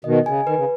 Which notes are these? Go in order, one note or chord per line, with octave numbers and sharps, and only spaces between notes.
B2 D#3 D#5
C#3 G#5
D#3 B4
C#3